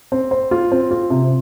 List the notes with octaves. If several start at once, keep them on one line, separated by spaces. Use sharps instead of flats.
C4
C5
F4
C4
F4
C3